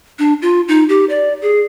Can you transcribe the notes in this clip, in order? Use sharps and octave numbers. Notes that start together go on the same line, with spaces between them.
D4
F4
D#4
G4
D5
G#4